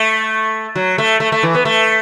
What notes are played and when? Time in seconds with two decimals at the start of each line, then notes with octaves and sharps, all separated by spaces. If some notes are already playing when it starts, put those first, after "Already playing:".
Already playing: A3
0.75 F#3
0.98 A3
1.20 A3
1.32 A3
1.43 E3
1.55 B3
1.65 A3